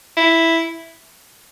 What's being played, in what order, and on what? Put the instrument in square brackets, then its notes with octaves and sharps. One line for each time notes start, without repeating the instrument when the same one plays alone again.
[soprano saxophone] E4